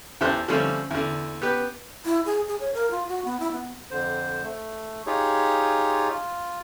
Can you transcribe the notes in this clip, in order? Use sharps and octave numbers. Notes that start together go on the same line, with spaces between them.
E2 G4 A4 C5 C6 F#6
D3 F3 G3 A3 C4 C#4
E2 D3
B3 G4 B4
E4
G#4
G#4
C#5
A#4
F4
F#4
B3
E4
B3
F2 D3 C5
A3
D#4 F4 G4 G#4 C#5
F4